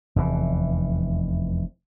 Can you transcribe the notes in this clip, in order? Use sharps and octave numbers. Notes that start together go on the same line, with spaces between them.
F1 E2 B2 E3